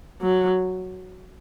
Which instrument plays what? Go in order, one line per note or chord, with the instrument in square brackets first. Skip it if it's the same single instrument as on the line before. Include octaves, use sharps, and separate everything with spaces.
[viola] F#3